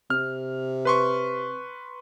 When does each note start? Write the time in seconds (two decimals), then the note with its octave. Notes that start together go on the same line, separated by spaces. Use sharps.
0.10 C3 F6
0.85 B4 C6 C#6